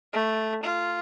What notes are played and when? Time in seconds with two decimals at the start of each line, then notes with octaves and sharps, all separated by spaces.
0.13 A3
0.63 F4